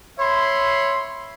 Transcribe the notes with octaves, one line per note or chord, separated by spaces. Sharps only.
C#5 E5 B5 C6